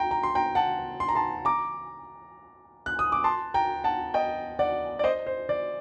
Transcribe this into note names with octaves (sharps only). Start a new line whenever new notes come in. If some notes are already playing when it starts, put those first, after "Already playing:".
Already playing: G5 A#5 C6
A#5
C6
G5 A#5
F#5 A5
C6
A#5
A5 C6
A#5 D6
F#6
D#6
D6
A5 C6
G5 A#5
F#5 A5
D#5 G5
D5 F#5
D5
C5 D#5
C5
D5